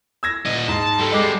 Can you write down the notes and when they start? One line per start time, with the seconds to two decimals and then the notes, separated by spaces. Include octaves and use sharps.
0.23 E6 G#6 A#6
0.46 A#2 D#5
0.68 G#2 A5
0.99 G3 A4
1.12 G#3 D6 C7